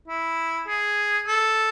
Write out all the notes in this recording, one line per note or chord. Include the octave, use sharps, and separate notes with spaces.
E4
G#4
A4